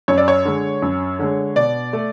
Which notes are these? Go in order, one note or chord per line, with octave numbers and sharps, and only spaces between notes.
F#2 C#5
D5
C#5
D3 G#3
F#2
D3 G#3
B2 D5
A3